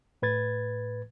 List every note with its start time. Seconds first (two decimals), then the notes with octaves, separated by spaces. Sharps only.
0.22 A2 B4 G#6 A6